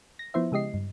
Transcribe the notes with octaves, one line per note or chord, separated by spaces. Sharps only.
A#6
F3 B3 E4 C5 E5
C#3 G#3 G4 D#5 C7
G2